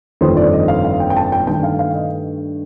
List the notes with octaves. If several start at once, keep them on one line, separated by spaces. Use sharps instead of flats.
G1 F2 D#3 A3 C4 C5
D5
D#5
F5
F5
G5
G5
A5
G5
G2 D#3 A3 G5
F5
F5
D#5